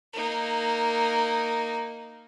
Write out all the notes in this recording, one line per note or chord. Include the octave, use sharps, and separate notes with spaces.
A#3 D#4